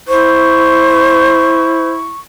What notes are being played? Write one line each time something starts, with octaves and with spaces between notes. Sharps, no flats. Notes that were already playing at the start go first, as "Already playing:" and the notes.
E4 C5 C#6